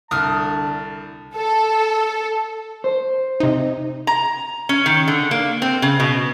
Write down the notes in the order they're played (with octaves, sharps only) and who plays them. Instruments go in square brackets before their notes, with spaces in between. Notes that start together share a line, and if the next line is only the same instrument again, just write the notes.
[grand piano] C2 [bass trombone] D3 [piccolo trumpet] A5 [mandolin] D#6 F6
[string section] A4
[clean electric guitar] C5
[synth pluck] C3 D#4
[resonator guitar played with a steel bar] A#5
C#4
D#3
D3
A#3
C4
C#3
B2